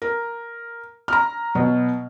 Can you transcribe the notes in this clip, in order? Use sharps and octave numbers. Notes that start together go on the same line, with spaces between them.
A#4
A#5 F6
B2 F#3